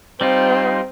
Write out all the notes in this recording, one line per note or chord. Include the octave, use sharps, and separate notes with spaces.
G3 C4 D#4 F4